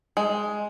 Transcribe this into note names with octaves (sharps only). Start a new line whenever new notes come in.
G#3